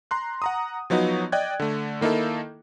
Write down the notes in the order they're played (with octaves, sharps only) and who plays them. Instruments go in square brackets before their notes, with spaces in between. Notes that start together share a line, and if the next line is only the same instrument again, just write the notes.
[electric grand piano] A#5 C6 F#6
F#5 A#5 D#6
F3 F#3 B3 D#4 F#4
D5 D#5 G5 F#6 G#6
D3 A3
D#3 A#3 D#4 E4 A4